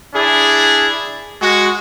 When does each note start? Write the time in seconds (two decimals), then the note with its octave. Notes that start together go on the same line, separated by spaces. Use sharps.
0.13 D4 E4 G#4
1.40 G#3 F#4